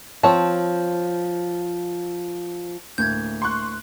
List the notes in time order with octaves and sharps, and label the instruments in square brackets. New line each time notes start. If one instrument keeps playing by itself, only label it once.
[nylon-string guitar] F3 [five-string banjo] C4 C#5 A5
[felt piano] D2 A2 A#3 [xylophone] G6 G#6
[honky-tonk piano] C6 C#6 F#6